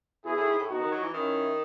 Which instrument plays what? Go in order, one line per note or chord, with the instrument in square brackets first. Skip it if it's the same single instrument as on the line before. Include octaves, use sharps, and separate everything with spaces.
[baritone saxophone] B2 [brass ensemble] E4 G#4
[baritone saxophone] A2
G#2
A2
[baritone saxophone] B2 [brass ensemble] D#4 F#4
[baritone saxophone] D#3
F#3
E3
[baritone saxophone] D#3 [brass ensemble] C#4 E4